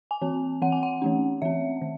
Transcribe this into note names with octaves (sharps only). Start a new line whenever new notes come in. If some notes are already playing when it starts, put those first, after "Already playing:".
G#5
E3 C4
E3 C4 F#5
G#5
F#5
E3 A3 C#4
E3 C4 E5
D#3